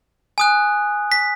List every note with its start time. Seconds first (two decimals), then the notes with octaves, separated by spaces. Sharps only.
0.38 G#5 D#6 F#6
1.12 B6